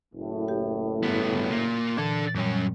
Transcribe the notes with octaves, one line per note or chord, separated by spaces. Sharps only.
F#1 A2
G4
G2 B3
A#2 A#3
A#2 E3 D4 A4 G#6
F#2 A#2 G3 C#4